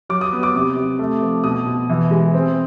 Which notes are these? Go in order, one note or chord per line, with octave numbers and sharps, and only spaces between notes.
F#3 D6
D#6
B3
D6
C3
C3
A3
F3
B2 D#6
B2
E3
G#3
C4